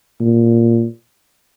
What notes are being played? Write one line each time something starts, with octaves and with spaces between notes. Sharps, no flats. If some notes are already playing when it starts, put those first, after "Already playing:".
A#2